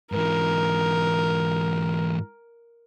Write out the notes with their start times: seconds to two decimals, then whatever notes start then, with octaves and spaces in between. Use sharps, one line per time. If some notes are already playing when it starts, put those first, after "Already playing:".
0.12 G#2 E3 A#4